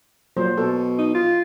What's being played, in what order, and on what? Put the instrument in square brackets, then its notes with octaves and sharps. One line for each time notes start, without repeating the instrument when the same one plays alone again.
[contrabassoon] A#2 [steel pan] F#3 C5
[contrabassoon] B2 [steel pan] A4
[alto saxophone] D#4
F4